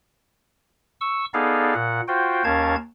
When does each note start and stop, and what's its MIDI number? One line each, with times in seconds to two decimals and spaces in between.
1.01 1.25 85
1.01 1.25 88
1.34 1.74 59
1.34 1.74 63
1.34 1.74 68
1.34 1.74 69
1.34 1.74 74
1.34 1.74 77
1.74 2.01 46
1.74 2.01 78
2.08 2.43 65
2.08 2.43 66
2.08 2.43 72
2.08 2.43 79
2.44 2.76 39
2.44 2.76 61
2.44 2.76 70
2.44 2.76 77
2.44 2.76 81
2.44 2.76 92